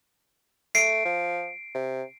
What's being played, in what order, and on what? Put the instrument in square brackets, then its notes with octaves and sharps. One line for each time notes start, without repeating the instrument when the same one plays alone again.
[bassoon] A3 [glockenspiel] C7 D7
[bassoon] F3
C3